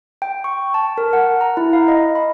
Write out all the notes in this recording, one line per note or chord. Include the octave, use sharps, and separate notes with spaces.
G5
C#6
A5
A#4
F#5
A#5
E4
F5
D#5
B5